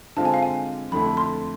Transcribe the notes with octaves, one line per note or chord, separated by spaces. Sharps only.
D3 G#3 C4 F4 A5
G#5
F5
G#5
F2 D3 A3 E4 B5
C6